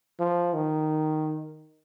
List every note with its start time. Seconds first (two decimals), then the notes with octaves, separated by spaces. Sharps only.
0.19 F3
0.54 D#3